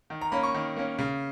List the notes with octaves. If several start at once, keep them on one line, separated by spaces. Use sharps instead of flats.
D#3
A#5
A#3 C#4 B5
C#6
D#3
A#3 C#4
C#3